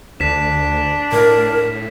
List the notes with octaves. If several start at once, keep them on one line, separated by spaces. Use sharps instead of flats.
D2 D4 B6 E7
A2 A#4